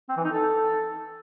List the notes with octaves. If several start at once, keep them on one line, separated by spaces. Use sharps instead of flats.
C4
E3
D#4
A4